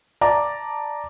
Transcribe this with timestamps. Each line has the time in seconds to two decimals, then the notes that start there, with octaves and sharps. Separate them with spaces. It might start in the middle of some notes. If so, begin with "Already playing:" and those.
0.21 D5 A5 A#5 D6